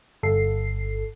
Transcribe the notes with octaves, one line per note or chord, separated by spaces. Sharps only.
G1 A4 C7